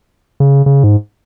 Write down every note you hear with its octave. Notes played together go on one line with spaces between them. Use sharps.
C#3
C#3
G#2